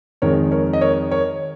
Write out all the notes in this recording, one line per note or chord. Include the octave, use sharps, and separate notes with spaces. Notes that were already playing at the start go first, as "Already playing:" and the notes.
F2 D#3 G#3 A#4 C#5
A#4 C#5
D#5
A#4 C#5
A#4 C#5